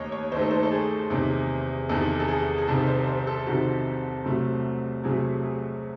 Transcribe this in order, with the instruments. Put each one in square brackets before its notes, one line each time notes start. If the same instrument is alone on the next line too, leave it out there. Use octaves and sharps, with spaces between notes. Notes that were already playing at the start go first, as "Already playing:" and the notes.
Already playing: [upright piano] D#2 D#3 A3 D#4 C#5 D#5
C#5
D#2 D#3 A3 D#4 C5
A4
C5
A4
G#4
E2 C3 D#3
E2 C3 D#3 A4
A4
G#4
G#4
C2 C3 D#3 A4
C5
C5
A4
C2 C3 D#3 F#4
C2 C3 F#3 A3
C2 C3 F#3 A3 G#4
G#4